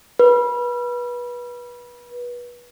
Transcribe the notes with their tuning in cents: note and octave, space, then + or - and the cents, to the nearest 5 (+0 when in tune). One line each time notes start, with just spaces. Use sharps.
B4 -25